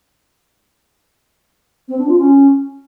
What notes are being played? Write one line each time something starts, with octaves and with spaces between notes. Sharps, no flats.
C4
D4
F4
C#4